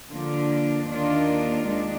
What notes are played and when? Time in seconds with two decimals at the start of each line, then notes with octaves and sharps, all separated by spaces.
0.11 D3 F3 A#3 D4 F4
0.89 D#2 D#3 A#3 D4 F4
1.67 D#2 D#3 G#3 D4